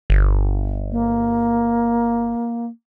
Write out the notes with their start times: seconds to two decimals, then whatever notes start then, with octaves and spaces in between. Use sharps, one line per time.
0.10 G1
0.91 A#3